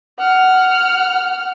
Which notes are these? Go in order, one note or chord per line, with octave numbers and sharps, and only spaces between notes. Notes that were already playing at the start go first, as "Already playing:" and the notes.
F#5 F6